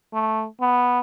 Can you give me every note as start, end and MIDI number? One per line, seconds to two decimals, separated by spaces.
0.13 0.45 57
0.61 0.99 59